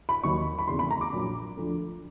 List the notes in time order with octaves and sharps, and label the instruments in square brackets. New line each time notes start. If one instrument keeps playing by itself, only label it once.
[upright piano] B5
D#2 D#3 F#3 C#6
B5
F1 E2 C#3 C6
B5
A#5
D6
A#1 A#2 F#3
D2 D3 F3